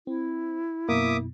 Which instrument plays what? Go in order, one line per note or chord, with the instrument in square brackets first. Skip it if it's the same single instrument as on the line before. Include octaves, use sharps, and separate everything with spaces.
[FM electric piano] C4 [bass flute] E4
[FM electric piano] F#2 B2 [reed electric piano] A#3 [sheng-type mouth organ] E5 D6 D#6